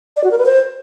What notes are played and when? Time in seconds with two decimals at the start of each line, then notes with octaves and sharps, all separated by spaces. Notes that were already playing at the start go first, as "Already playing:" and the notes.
0.17 D5
0.24 F#4
0.31 A#4
0.38 B4
0.46 C5